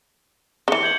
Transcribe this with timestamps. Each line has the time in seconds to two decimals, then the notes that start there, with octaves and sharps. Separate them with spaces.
0.68 C#3 E3 C#7 G7
0.83 G6 G#6 F#7